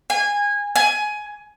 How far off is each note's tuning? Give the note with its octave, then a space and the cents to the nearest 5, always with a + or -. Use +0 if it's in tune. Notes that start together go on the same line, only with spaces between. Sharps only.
G#5 -20
G#5 +15